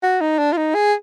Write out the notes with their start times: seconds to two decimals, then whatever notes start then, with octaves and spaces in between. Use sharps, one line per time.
0.03 F#4
0.21 D#4
0.39 D4
0.53 F4
0.57 D#4
0.75 G#4